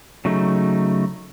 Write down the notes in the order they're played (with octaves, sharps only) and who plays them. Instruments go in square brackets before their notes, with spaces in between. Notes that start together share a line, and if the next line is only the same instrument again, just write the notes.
[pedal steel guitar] C#3 F#3 A3 D#4